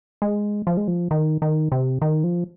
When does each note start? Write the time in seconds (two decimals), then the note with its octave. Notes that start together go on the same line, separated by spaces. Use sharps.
0.22 G#3
0.67 F3
0.77 G#3
0.88 F3
1.11 D#3
1.42 D#3
1.72 C3
2.02 D#3
2.24 F3